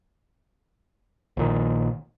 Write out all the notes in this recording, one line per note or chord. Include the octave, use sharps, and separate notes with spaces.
A#1 A#2 D#3